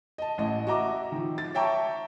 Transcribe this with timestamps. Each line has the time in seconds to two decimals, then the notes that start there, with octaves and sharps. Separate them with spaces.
0.18 D#5 A5
0.38 A1 D#5
0.67 F#4 D#5 E5 A#5 D6
1.12 D#3 F3
1.38 A6
1.55 C#5 E5 G5 A5 A#5 C#6